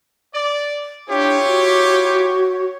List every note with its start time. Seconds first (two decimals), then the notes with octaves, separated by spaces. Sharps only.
0.34 D5
1.09 D4 E4 F4 G4 C#5
1.47 F#4